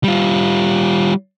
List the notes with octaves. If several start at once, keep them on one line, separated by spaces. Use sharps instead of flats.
G3 F4